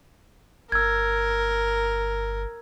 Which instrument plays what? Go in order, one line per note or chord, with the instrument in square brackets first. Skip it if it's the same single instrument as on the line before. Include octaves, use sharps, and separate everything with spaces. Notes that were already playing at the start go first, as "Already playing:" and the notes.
[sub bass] G1 [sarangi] A#4 [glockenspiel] E6 G#6